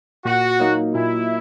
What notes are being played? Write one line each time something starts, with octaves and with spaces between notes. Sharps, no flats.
A#2 F#4
F#3 A#3 D#4
A#2 E4